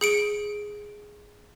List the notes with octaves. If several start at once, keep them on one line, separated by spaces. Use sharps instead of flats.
G#4 C#7 D7